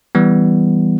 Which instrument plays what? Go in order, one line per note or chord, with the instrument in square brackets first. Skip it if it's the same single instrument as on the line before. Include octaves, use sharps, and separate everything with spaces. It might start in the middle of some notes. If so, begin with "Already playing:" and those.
[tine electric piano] E3 G3 B3